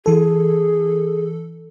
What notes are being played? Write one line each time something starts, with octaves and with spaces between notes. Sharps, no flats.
E3 G#4 A4